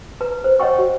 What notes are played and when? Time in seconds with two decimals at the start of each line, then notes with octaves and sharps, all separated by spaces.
0.21 B4 A#5
0.44 C5
0.60 C#5 D#5 F#5 G5 C#6
0.78 F#4